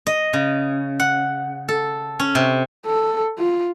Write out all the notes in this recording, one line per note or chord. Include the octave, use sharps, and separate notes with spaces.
D#5
C#3
F#5
A4
C#4
C3
A4
F4